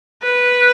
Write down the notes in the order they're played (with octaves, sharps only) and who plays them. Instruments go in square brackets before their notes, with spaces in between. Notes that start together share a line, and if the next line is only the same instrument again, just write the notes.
[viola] B4